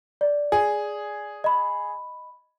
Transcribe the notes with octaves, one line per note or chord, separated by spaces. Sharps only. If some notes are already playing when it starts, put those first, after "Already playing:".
D5
G#4
D#5 B5